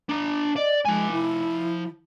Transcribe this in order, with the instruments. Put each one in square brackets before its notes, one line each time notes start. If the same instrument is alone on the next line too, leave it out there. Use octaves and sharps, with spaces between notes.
[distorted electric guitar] D4 A#5
[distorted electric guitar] D5 [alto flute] D#5
[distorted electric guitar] F3 G#5 [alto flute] G#3
[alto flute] E4